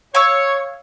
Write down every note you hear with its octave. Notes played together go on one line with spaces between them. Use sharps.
C#5 F5 C#6 E6